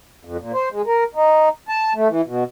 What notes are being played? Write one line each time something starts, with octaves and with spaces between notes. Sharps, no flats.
F2
A#2
C5
G#3
A#4
D#4
A5
A3
E3
B2